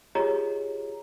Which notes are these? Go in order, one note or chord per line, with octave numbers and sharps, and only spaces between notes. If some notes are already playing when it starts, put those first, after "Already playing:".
F4 G4 G#4 C#5 D#5 A#5